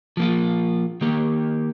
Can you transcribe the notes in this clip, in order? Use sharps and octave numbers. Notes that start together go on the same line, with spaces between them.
F3 A#3 F4
D#3 A#3 G4